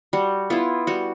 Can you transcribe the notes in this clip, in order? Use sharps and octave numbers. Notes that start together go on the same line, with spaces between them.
G3 F#4
B3 E4 F4
G3 F#4